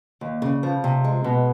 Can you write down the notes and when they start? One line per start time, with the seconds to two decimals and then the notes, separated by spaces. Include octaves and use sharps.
0.21 D#2
0.42 C#3
0.63 F3
0.84 C3
1.04 G#3
1.24 B2